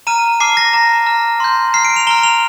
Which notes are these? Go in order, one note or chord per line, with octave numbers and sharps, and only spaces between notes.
A#5 F6 D#7
A5 D6 F6 C7
A#6
A#5 D6 F6 A#6
A#5 F6
C6 G6
A#5 F6 C7
D7
F7
A#5 F6 G7
F7